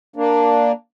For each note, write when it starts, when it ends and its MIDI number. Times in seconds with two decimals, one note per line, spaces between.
0.16 0.72 58
0.16 0.72 62